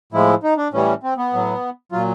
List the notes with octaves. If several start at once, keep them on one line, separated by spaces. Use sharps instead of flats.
A2 F3 G#3 E4
D#4
D4
A2 E3 G3 C#4
C4
B3
A2 F#3
A#2 F#3 F4